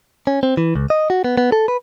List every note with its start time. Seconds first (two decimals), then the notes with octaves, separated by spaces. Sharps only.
0.27 C#4
0.43 C4
0.57 E3
0.75 C#2
0.90 D#5
1.10 F#4
1.24 B3
1.38 B3
1.52 A4
1.68 B4